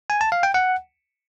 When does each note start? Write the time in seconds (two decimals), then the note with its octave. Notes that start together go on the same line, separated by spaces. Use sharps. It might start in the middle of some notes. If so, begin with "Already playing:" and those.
0.10 G#5
0.21 A5
0.32 F5
0.43 G5
0.54 F#5